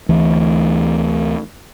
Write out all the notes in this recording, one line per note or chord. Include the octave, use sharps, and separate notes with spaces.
D2 E3 A3